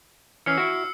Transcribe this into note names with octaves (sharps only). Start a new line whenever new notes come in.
E3 C#4 E6 F6 C7 C#7
E4 F#4